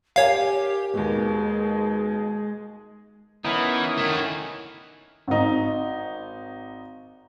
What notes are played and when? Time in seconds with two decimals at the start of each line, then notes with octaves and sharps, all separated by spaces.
0.16 G4 A#4 C#5 F5 G#5
0.94 D#2 B2 G#3
3.45 E3 B3 C#4 D#4 E4 A#4
3.97 D#3 A3 F#4
5.28 G#1 D#4